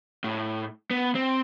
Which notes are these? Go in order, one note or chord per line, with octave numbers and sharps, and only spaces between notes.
A2
B3
C4